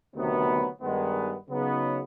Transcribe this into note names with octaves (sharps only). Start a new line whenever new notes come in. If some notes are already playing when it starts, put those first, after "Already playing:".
D2 C3 D#3 F#3 B3
G2 D#3 G#3 B3
C#3 F#3 B3 D#4